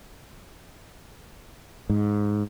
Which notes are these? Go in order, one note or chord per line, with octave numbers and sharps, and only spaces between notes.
G#2